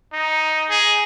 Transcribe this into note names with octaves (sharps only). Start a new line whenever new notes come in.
D#4
G#4